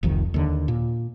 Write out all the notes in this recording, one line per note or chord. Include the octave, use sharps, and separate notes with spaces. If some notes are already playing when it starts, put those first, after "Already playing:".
F1 C2 F2 D#3
D#2 D3
A#2